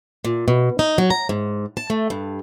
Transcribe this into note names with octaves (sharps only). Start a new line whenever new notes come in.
A#2
B2
D#4
F#3
A#5
G#2
A5
A3
G2